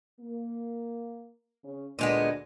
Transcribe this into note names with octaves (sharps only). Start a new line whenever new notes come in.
A#3
C#3 C#4
D2 A#2 G#3 B3 D4